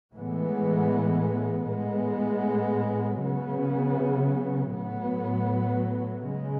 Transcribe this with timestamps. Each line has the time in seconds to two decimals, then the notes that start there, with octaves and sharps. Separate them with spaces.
0.13 A2 E3 G#3 B3
1.67 A2 G#3 B3
3.20 C#3 F#3 B3
4.73 A2 F#3 B3
6.27 C#3 G#3